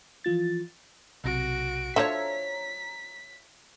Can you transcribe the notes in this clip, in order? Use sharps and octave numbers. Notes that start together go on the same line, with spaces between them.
E3 F3 F4 A6
B1 C3 F#4 A#6 D7
D3 F3 C#5 E5 A#5 B6